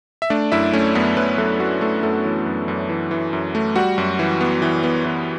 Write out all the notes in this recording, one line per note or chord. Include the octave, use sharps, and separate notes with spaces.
E5
A3 D4 D5
F#2 E4 E5
A3 C#4 C#5
F#2 B3 B4
F#2 B3 B4
F#2 A3 A4
A3 F#4
A3 A4
F#2 A3 A4
E3
F#2
F#2
E3
E3
F#2
A3
G3 F#4 F#5
F#2
E3
B3
E3
B3
E3